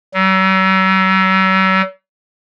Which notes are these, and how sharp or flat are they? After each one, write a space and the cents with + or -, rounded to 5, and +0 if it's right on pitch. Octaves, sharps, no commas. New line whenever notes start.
F#3 +45